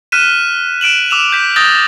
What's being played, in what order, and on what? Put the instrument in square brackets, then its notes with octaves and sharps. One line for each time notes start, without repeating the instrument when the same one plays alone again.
[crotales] F6 F#6 B6 D#7 E7
F#6 D7 E7 F#7
D6 E6 E7 F7
G6 B6
D#6 E6 G6 A6 A#6 G7